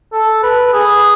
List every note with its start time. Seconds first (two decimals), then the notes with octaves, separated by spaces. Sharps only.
0.13 A4
0.43 B4
0.73 G#4